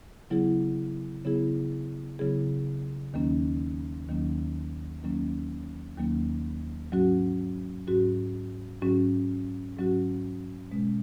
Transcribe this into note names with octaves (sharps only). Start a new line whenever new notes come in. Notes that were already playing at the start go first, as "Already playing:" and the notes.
C#3 F#3 B3 E4 G#4
C#3 F#3 B3 E4 G#4
C#3 F#3 B3 E4 G#4
D#2 D#3 F#3 A#3 C#4
D#2 D#3 F#3 A#3 C#4
D#2 D#3 F#3 A#3 C#4
D#2 D#3 F#3 A#3 C#4
G#2 F#3 C#4 F#4
G#2 F#3 C#4 F#4
G#2 F#3 C#4 F#4
G#2 F#3 C#4 F#4
B2 G#3 C#4